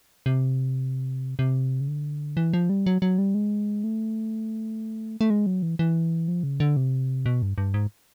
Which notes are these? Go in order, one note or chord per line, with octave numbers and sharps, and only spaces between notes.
C3
C3
C#3
D3
E3
F3
G3
F#3
F#3
G3
G#3
A3
A3
G#3
F#3
E3
E3
F3
C#3
D3
C3
B2
G2
G2
G#2